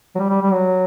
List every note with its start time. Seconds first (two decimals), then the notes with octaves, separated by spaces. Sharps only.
0.15 F#3
0.19 G3
0.30 G3
0.42 G3
0.52 F#3